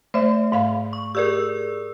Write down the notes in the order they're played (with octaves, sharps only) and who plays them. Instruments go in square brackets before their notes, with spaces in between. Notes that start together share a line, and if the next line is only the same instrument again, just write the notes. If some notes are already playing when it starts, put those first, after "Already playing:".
[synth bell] A3 [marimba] C5 E5
[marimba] G#2 F5 B5
[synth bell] C#6
[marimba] G4 G#4 [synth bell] A#4 D5 E6